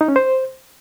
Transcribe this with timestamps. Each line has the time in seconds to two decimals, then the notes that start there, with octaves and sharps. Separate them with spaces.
0.01 D#4
0.08 C#4
0.16 C5